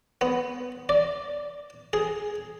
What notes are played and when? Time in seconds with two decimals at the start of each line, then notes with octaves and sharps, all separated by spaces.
0.21 B3
0.89 D5
1.93 G#4